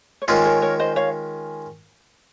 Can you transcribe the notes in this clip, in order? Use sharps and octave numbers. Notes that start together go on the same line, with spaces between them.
C#5
D#3 G#3 C#4 F4 C5
A#4 C#5
A#4 C#5
C5 D#5
C#5 F5